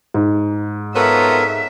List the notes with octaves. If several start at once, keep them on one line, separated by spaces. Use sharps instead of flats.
G#2
B3 F4 A4 A#4 C#5 E5